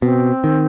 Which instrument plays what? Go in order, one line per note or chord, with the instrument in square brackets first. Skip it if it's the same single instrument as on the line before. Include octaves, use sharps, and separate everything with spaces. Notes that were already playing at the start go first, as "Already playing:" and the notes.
[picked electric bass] B2 [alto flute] C4
[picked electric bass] D#3